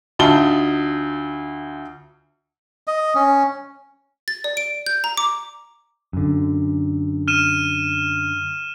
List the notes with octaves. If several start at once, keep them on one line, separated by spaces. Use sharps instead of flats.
D2 D#4 F4 A5 G7
D#5
C#4
A6
D5
D7
G6
A#5
D6
F#2 D3
F6 D#7 E7